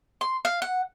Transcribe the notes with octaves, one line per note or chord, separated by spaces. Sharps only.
C6
F5
F#5